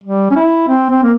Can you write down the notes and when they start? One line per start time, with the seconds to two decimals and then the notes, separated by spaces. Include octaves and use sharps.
0.03 G3
0.31 C#4
0.35 E4
0.68 C4
0.90 C4
1.03 A#3